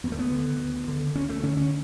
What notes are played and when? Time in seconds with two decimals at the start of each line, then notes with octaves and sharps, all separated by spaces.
0.04 D2 B3
0.12 A3
0.19 B3
0.32 D3
0.59 D2
0.88 D3
1.15 D2 C#4
1.29 A3
1.43 D3 C#4
1.57 C#4